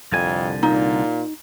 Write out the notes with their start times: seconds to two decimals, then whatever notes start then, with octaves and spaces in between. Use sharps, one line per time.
0.12 C2 F2 D3 G#5
0.63 A#2 D#4